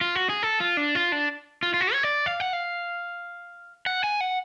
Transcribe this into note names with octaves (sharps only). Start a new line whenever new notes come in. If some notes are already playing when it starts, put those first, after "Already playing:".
F4
F#4
G#4
A4
F4
D4
F4
D4
F4
F4
F#4
C#5
D5
F5
F#5
F5
F#5
G#5
F#5